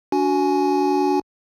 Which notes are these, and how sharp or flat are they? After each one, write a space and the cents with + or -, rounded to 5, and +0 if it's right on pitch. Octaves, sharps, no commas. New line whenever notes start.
D4 -25 F#4 +0 G#5 +15